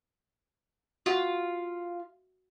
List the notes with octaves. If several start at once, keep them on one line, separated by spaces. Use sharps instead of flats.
F4 F#4